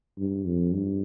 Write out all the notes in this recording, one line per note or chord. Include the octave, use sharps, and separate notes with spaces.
G2
F2
G2